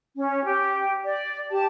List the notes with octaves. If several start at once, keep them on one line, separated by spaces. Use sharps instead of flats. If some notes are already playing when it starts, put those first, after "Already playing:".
C#4
G4
D5
G4 A5